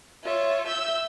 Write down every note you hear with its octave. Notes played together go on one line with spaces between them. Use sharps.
F4 C#5 E5
E5 E6 G6